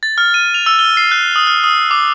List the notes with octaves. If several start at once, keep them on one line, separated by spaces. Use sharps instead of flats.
A6
F6
D#7
F7
E6
G7
C7
F#6
D#6
F6
D#6
D6